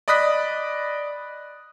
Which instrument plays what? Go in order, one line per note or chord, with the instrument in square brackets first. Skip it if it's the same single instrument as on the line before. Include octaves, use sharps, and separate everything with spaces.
[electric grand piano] D5 D#5 B5 D#6 F#6 B6